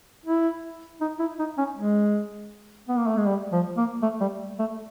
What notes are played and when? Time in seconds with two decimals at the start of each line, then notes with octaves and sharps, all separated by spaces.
0.26 E4
1.01 D#4
1.19 E4
1.39 D#4
1.58 C#4
1.76 G#3
2.88 B3
2.98 A#3
3.07 A3
3.17 G#3
3.27 G3
3.52 F3
3.77 A#3
4.02 A3
4.21 G3
4.59 A3